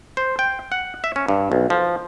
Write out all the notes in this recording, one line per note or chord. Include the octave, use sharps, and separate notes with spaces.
C5
G5
F#5
E5
C#4
G2
B1
F3